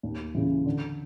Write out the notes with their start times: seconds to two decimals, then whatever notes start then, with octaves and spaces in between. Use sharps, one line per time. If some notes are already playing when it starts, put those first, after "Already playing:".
0.03 D#2
0.35 C#3 E3
0.66 D3